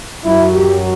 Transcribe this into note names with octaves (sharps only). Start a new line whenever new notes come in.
F#2 F#3 E4
G4